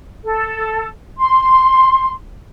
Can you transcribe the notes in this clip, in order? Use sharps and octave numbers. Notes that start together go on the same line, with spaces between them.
A4
C6